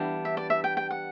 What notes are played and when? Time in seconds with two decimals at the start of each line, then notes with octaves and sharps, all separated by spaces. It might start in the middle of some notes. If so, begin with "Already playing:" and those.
Already playing: E3 G3 B3 D4 G4
0.25 E5
0.37 D5
0.50 E5
0.64 G5
0.77 G5
0.91 F#5